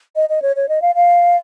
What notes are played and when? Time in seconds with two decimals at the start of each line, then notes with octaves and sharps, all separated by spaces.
0.16 D#5
0.29 D#5
0.42 C#5
0.56 C#5
0.69 D#5
0.82 F5
0.95 F5